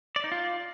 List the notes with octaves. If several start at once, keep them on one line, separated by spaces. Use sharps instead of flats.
D5
D#4
F4